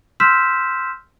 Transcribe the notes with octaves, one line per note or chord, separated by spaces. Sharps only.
C6 E6 F6 G6 B6 E7